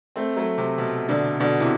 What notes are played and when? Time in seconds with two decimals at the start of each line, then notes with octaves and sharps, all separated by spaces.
0.16 A3 C4
0.37 F#3 A3
0.58 C3
0.78 B2
1.09 B2 D3
1.40 B2 D3
1.60 C3 E3